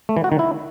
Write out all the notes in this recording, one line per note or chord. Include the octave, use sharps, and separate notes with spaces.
A3
E3
F#4
D#3
E4